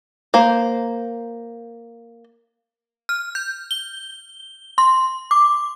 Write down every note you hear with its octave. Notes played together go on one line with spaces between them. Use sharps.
A#3 C5
F6
G6
G7
C6
D6